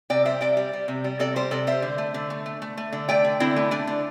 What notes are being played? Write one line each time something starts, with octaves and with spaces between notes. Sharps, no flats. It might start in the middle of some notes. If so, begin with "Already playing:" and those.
C3 D5 G5
G3 C5 E5
C3 D5 G5
G3
G3
C3
G3
C3 A4 D5
G3 G4 C5
C3 A4 D5
G3 C5 E5
D3
A3
D3
A3
A3
A3
A3
D3
A3 D5 G5
D3
D3 C4 E4
A3
A3 D4
D3